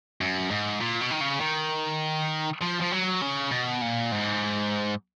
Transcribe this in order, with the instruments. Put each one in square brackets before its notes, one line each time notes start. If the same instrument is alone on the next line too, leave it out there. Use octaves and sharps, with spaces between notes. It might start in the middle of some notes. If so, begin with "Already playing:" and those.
[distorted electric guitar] F#2
G#2
A#2
B2
D#3
C#3
D#3
F3
F3
F#3
C#3
B2
A#2
G#2